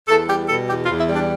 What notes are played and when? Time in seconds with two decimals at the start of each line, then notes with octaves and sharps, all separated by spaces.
0.08 E2 A4
0.28 G3 G4
0.49 B2 A4
0.68 E2 G4
0.85 F4
0.89 E2
0.99 E4
1.09 G3 D4